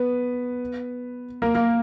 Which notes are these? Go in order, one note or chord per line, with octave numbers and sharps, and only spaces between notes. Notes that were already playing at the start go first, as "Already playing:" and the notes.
Already playing: B3 B4
A#3 A#4
A#3 A#4